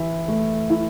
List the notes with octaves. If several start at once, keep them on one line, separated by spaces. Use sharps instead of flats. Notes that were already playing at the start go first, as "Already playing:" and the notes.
Already playing: E3 E4
A3
E4